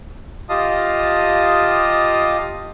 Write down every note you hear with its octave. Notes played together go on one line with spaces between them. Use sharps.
F4 G4 D#5 F5 A5 D#6